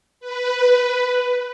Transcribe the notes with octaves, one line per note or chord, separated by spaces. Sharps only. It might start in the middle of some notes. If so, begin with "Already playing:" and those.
B4